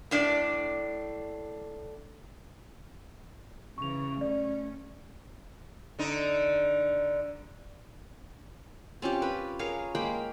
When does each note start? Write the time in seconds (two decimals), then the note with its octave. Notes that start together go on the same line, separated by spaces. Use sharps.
0.11 A2 D4 D5
3.78 C#3 E3 C#6 F7
4.21 A3 C#4 D5
5.99 D3 D#4
9.02 C4 C#4 F4 G4
9.22 B4
9.59 G#4 A#4 C#5 F5
9.95 G#3 A#3 G5 B5